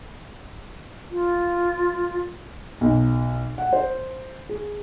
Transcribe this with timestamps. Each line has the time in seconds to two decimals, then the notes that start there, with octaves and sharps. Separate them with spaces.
1.11 F4
2.81 B1
3.58 F#5
3.73 C5
4.49 G#4